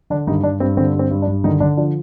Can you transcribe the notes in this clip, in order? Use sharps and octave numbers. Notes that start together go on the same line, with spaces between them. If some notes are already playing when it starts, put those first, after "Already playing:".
D3 D4
G2 D#3 D#4
G2 D4
G2 C4
D3 C4
G2 C4
G2
D4
G2
D3 D#3 D#4
D3 D4
F3 D4